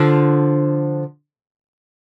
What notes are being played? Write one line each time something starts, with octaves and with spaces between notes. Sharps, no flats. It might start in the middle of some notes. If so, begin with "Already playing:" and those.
Already playing: D3 F3